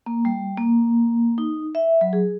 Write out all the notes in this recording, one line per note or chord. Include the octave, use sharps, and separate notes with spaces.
A#3
G3
A#3
D#4
E5
F#3
G#4